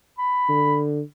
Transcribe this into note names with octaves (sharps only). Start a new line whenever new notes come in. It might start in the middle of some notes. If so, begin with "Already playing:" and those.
B5
D3